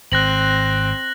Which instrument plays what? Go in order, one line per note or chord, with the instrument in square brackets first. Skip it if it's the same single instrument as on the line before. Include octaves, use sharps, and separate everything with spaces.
[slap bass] G#1 [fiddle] C4 [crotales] F#6 A#6 F#7